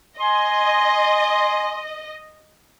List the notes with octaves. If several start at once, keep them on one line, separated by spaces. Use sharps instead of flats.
D#5 G#5 C6